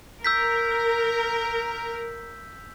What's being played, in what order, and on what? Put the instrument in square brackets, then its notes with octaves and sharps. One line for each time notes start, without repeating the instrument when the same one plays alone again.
[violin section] A#4 [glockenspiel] E6 G6 B6